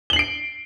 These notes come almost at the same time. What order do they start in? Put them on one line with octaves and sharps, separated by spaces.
G7 F#7 C7 D7